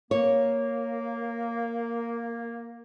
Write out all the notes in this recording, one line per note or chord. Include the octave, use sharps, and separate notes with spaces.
A#3 C#5